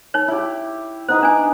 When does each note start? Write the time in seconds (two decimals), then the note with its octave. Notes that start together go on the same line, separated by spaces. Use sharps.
0.14 D#4 C#5
0.28 E4 G4
1.09 B3 D#4 B4 C5
1.23 D4 G#5